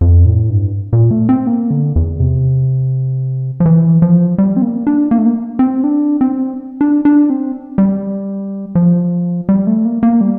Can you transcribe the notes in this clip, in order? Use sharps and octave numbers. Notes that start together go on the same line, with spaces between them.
F2
A2
G2
A#2
A3
C4
A#3
D3
E2
C3
F3
E3
F3
G3
C4
A#3
D4
A#3
A3
A#3
C4
D4
C4
D4
D4
C4
G3
F3
G3
A3
A#3
A#3
G3